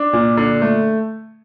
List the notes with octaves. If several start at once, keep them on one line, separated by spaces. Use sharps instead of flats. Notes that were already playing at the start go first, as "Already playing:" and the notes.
Already playing: D4
A#2
D3
A3